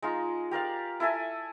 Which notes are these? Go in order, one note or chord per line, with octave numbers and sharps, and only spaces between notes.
G#3 D#4 F4
G4 A#4 D5 F5
E4 A4 E5 G#5